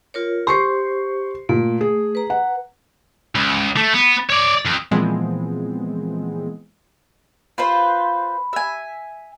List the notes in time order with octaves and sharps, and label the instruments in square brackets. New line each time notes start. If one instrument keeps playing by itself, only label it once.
[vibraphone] F4 A#4 C#5
[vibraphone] G4 C5 [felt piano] C6 C#6 C7
[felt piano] A#2 [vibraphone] A3
[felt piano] G#4
[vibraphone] B4 A#5
[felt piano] F#5
[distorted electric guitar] C#2
A3
B3
C#5 D5
F2
[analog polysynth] A#2 E3 F3 G#3 B3 C4
[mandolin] F4 B4 C5 [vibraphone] B5
[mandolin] E5 G#5